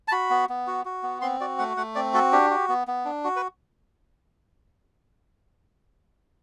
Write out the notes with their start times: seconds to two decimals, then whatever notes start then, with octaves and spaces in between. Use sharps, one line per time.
0.08 A5
0.12 F#4 B5
0.30 B3
0.49 B3
0.67 F#4
0.85 F#4
1.03 B3
1.22 C4 C6
1.41 F#4 D5
1.58 A3 F#5
1.77 A3 F#5
1.95 C4 D5
2.14 F#4 A4
2.32 D4 G4
2.50 F#4
2.69 B3
2.88 B3
3.05 D4
3.24 F#4
3.36 B4